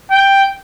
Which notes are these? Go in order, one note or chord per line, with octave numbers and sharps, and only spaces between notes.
G5